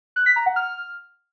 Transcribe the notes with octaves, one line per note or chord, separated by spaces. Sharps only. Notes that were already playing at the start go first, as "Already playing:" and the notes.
F#6
B6
A#5
F#5
F6